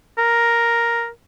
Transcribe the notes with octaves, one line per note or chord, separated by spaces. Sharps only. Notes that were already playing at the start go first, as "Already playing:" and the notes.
A#4